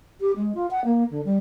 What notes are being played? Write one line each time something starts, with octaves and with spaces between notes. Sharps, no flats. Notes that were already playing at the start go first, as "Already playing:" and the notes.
G4
G#3
F4
F#5
A#3
D3
G3